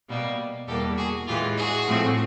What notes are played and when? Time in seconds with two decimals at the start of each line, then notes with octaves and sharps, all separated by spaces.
0.08 B2 G3 A#3
0.67 E2 B2 G3 A#3 G4 A4
0.97 F#4 G#4
1.27 A2 E3 G#3 F4 G4
1.56 F#4 G#4
1.86 A2 F3 A3 C4